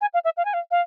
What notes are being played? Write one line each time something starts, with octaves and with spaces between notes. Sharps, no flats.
G#5
F5
E5
F5
G#5
F5
F5